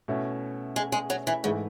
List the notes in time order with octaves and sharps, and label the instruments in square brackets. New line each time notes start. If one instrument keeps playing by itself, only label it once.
[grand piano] B2 A3 C#4 E4
[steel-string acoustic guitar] G#3
G#3
F#3
E3
[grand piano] G#2 E3 A3 [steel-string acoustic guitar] C#3